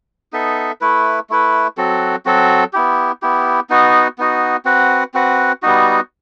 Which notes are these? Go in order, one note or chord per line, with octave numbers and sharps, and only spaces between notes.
B3 D#4 A4 E5
A3 E4 B4
A3 E4 B4
F#3 C4 F#4 A4
F#3 C4 F#4 A4
B3 E4 G4
B3 E4 G4
B3 D#4 F#4
B3 D#4 F#4
C4 F#4 B4 F#5
C4 F#4 B4 F#5
G3 B3 D#4 F#4